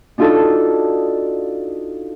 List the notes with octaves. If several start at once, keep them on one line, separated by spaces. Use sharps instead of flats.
D4 D#4 F4 F#4 A4